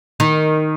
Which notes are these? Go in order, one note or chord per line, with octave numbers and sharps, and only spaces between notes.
D#3